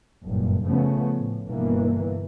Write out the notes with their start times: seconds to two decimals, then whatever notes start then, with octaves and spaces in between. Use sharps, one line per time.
0.24 F#1 G2 A#2
0.67 C#3 F3 A3 B3 C#4
1.16 A2
1.48 G1 B2 E3 A#3